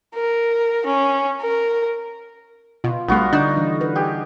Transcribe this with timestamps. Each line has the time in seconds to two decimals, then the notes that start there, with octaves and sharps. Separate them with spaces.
0.15 A#4
0.86 C#4
1.41 A#4
2.84 B2 F4
3.08 A#1 G3 A3 B3 F4 F#4 F5
3.33 D3 D4 D#4
3.57 E3
3.81 B4
3.95 G4 G#4